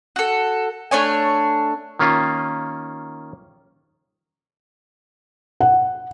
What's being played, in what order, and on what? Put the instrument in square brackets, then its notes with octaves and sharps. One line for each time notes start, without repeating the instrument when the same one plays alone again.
[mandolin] F#4 A4
A3 D4 C#5 G#5
[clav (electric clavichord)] D#3 A#3 C#4 F4
[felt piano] F#5